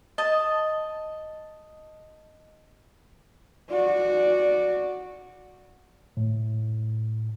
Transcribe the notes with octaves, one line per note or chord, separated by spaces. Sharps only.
D#5 A5
F#4 D5
A2